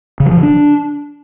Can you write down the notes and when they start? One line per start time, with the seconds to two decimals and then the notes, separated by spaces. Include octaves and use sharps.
0.20 C#3
0.26 F#3
0.31 F3
0.37 C#3
0.43 D4